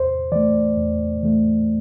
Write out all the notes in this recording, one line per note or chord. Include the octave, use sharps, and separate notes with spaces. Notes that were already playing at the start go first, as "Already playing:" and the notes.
Already playing: E2 C5
E3 A3 D5
E2
E3 A3